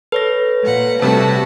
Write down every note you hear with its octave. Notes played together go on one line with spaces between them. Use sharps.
A4 B4 C#5 A#6
A#2 F#5
C3 G3 A3 F#4 A5 B5